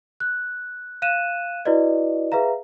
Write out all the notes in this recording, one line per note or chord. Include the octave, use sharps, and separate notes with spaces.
F#6
F5 F#6 D#7 E7
E4 F#4 B4 D5 D#5
G#4 B4 E5 F5 A#5